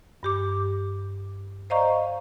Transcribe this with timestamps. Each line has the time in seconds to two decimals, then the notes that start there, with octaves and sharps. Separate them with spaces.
0.23 G2 G4 D6
1.70 C5 D5 D#5 F5 A#5 C#6